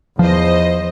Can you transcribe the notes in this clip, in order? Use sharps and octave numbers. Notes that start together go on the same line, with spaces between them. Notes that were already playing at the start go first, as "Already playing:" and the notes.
E2 F3 C5 D#5